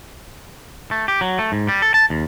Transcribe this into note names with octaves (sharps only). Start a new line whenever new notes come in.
A3
G4
F#3
A3
G#2
G3
A4
A5
D#2